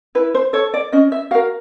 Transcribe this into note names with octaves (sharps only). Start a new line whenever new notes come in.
E4 B4
C5
A4 C#5
D5
C#4 D#5
E5
F#4 A#4 F5